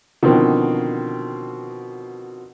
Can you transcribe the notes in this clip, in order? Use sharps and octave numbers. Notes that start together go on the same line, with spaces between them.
B2 D3 D#3 F3 C4